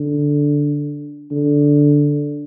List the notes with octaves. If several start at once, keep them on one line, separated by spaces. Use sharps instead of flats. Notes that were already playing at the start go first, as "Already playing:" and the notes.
Already playing: D3
D3